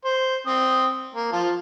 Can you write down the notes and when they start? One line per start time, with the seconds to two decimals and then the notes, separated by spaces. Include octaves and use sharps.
0.05 C5
0.47 C4 D#6
1.15 A#3
1.32 F3 F4 A5